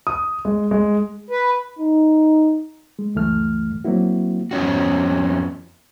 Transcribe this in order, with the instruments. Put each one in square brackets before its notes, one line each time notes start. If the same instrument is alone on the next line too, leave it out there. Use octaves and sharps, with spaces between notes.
[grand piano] D#6
G#3
G#3
[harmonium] B4
[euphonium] D#4
[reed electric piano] G#3
C#2 F#2 E3 A3 F6
F#3 A#3 C4 E4 F#4
[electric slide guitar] F2 B3 C#4 F#4